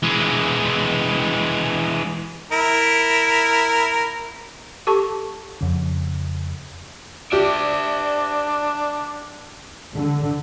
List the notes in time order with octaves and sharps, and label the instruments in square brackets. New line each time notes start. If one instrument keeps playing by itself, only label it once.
[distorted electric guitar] E3 G#3
[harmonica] E4 A#4
[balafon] G4 A4 A5 C#6
[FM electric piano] F2 C#3
[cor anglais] D4 [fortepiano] G4 [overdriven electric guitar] D5 E5
[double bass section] D3